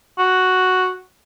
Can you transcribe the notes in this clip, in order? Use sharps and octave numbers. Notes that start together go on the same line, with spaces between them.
F#4